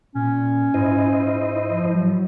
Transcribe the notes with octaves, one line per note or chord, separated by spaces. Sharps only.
A#2 C#4
G#2 E4 C5 D#5
F3
F#3